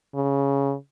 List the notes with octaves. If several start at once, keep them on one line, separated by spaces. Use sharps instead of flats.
C#3